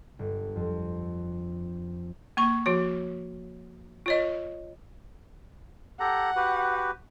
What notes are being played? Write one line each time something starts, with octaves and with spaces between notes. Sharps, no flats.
G1
F2
A#3 C#6
F3 F#4 C#5
F4 C#5 D#5
G4 A4 F#5 A#5
F#4 G4 B4